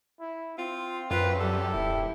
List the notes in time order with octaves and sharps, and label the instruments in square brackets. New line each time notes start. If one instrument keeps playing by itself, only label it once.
[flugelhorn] E4
[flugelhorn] C4 [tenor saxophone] F4
[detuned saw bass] F#2 [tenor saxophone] F4 [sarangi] B4
[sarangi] G3 [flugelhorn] G4 [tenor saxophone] A4
[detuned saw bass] D#1 [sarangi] E4